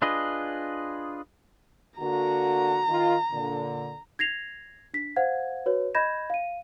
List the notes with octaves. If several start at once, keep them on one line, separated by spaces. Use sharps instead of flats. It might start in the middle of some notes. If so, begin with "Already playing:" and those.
D4 F4 G#4 B4 D#5
D3 A#3 F#4 A#5
D#3 F4
A#2 D3
G#6 A#6 C7 F7
D4 B6
C5 F5 F#5 G#6
F#4 B4 C#5
D#5 B5 G6 G#6 A#6 E7
F5 D#7